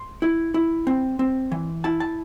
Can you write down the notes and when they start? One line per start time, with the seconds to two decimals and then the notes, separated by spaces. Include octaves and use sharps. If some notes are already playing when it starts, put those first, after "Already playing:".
Already playing: C6
0.22 E4
0.54 E4
0.87 C4
1.19 C4
1.52 E3
1.84 E4 A5
2.00 A5